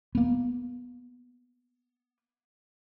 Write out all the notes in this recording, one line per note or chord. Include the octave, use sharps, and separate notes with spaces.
A#3 B3